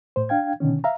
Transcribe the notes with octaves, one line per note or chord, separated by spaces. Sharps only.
A2 C5
D4 F5 G5 G#6
B2 D3 D#3 C#4
E5 F5 A#5